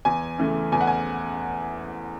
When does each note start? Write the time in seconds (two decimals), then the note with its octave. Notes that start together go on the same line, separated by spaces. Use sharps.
0.05 E2 G#5
0.38 C#3 E3 A3
0.72 E2 G#5
0.81 F#5
0.87 G#5